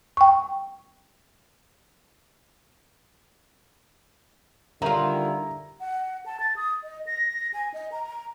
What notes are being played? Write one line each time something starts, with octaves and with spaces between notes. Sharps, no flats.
G5 C#6
D3 D#3 G3 E4 F4 A#5
F#5
A5
A6
D#6
D#5
A#6
G#5
D#5
A#5